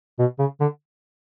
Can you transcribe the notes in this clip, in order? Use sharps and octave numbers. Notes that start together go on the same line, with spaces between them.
B2
C#3
D3